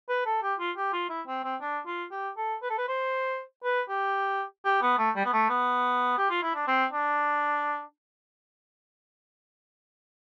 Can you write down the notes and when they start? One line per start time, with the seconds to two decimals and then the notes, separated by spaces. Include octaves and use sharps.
0.09 B4
0.26 A4
0.42 G4
0.59 F4
0.77 G4
0.93 F4
1.10 E4
1.27 C4
1.44 C4
1.61 D4
1.86 F4
2.11 G4
2.37 A4
2.62 B4
2.70 A4
2.78 B4
2.88 C5
3.64 B4
3.89 G4
4.65 G4
4.82 B3
4.98 A3
5.16 G3
5.25 B3
5.33 A3
5.49 B3
6.18 G4
6.30 F4
6.43 E4
6.55 D4
6.68 C4
6.93 D4